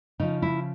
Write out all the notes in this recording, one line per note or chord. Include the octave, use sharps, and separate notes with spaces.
C#3 F3 D#4
E4